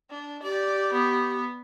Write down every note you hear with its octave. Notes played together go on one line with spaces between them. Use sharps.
D4
G4 D5
B3